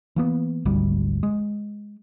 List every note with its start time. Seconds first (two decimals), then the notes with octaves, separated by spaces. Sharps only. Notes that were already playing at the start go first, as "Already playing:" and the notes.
0.16 E3 A#3 B3
0.65 G#1 D2 G3
1.23 G#3